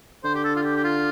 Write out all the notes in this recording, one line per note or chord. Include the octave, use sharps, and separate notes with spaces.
D3 C5
G4
A4
F4
G4
G4
F4